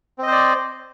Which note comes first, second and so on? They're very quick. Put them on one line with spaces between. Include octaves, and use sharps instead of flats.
C4 D#5 C5 D5